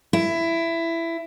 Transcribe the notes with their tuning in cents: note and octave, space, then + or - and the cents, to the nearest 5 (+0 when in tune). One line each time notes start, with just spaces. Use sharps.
E4 +15